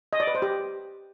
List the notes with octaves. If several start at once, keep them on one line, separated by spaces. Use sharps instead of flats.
D#5
D5
B4
C5
G4